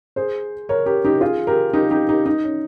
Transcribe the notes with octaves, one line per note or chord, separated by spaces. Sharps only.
G#4 C5
A#4 C#5
G4 A#4
D#4 G4
F4 G#4
G4 A#4
D#4 G4
D#4 G4
D#4 G4
D#4
C#4